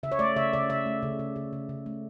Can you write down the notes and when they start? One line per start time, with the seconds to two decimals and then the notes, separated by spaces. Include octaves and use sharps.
0.03 C#3 E5
0.12 C#5
0.19 A3 D5
0.36 C#3 E5
0.53 C#3 D5
0.69 C#3 E5
0.86 A3
1.02 C#3
1.19 C#3
1.36 C#3
1.53 C#3
1.69 C#3
1.86 A3